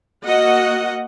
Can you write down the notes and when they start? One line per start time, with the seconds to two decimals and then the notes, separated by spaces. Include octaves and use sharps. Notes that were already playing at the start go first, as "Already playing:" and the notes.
0.25 A#3 F#4 D#5 F#5